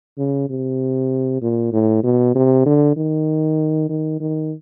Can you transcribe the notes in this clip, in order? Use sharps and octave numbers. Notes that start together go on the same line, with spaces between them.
C#3
C3
A#2
A2
B2
C3
D3
D#3
D#3
D#3